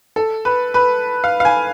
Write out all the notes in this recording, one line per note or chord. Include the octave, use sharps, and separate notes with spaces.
A4
B4
B4
F5
F5
G#5